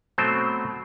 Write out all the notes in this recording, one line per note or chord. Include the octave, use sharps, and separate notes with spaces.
B2 F#3 A3 C4 C5